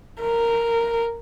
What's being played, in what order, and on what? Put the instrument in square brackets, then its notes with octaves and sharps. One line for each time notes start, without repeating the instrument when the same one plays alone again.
[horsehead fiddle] A#4